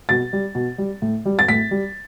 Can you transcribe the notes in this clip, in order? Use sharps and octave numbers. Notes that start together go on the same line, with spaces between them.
B2 A6
G3
B2
G3
A2
G3
A6
A2 B6
G3